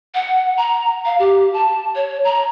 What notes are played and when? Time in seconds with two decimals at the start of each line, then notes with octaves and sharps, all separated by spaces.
0.15 F#5
0.57 A#5
1.05 F5
1.19 G4
1.53 A5
1.96 C#5
2.24 A#5